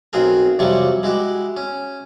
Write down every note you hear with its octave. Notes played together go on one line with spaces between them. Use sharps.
B1 C4 F#4 G#4 A#4
F2 C3 E3 F#3 G3 C#6
G#3 E4 F#4 G4
C#4